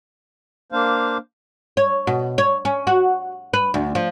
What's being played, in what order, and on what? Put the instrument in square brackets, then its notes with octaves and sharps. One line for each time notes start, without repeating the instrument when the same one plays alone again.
[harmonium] A#3 D4 C5 F5
[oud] C#5
B2
C#5
C#4
F#4
B4
D2
F3